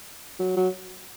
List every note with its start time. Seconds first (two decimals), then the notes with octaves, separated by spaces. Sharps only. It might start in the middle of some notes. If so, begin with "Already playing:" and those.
0.40 F#3
0.56 F#3